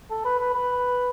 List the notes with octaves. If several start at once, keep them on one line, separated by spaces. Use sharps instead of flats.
A4
B4
B4
B4